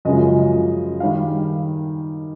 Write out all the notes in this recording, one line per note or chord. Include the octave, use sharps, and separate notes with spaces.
F#2 C#3 F3 G#3 D#5
F5
D#3 G3